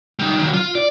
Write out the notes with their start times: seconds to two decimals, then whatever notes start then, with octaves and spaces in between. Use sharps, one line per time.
0.19 G3 D#4
0.39 D#3 F#3
0.54 F4
0.75 D5